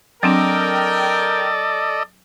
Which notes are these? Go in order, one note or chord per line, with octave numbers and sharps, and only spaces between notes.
F#3 C4 D4 A4 A#4 D5 D#5 G5